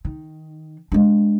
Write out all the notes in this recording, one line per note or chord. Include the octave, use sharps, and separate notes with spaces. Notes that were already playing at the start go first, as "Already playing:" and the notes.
D#3
G#3 D4